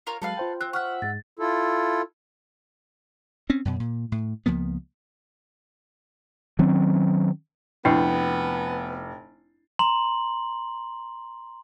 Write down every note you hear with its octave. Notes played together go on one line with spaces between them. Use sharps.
F4 A#4 C#5
F#3 G#3 A4 B4 F5
F4 C5 G5
C4 F#6
E5 F#5 C#6 F6 F#6
G#2 G#3 A6
E4 F4 A4
C4 C#4
F#2 B2
A#2
A2
C#2 F3 A#3 B3
D#3 F#3 C4 C#4
F1 B3 D4 E4 G5
A#5 C6 F#7